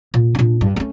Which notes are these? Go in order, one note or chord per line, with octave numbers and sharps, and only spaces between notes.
A#2
A#2 D4
G2
A3 C#4